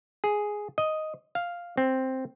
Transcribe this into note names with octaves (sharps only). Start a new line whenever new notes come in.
G#4
D#5
F5
C4